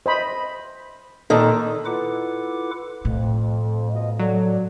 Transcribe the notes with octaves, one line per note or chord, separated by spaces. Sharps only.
C5 D#5 B5
A#2 D#3 A4
E4 F4 A4 B4 F#5 D6
F2 A2
B2 F3 D#5
F#3 A4 D5